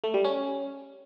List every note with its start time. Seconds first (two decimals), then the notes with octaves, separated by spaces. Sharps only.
0.04 A3
0.14 G3
0.24 C#4